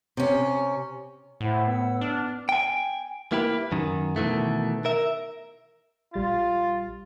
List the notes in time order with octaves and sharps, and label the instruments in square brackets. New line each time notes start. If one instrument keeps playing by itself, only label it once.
[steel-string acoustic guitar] C3 C#4
[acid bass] A2 [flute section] E4 C5 F#5
[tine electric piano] B3 [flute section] F#5 E6
[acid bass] D4 [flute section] F6
[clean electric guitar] G5 G#5
A#3 E4 G4 B4
F#2 D#3
B2 D#3 E3 A3
A#4 E5
[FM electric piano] A#1 G3 A6 [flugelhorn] F4